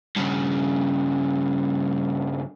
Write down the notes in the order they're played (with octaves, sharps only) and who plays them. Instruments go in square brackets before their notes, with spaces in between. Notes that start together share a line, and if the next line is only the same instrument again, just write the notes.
[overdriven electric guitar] G2 C#3